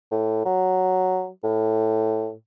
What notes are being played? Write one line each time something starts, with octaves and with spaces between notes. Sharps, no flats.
A2
F#3
A2